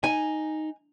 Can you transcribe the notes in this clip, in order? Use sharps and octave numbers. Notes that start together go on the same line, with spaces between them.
D#4 G#5